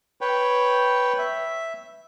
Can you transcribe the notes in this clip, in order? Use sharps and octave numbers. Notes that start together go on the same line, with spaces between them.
B4 C#5 G5
E5